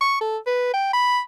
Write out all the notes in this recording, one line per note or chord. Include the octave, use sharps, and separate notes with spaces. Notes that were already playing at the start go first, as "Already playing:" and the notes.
C#6
A4
B4
G5
B5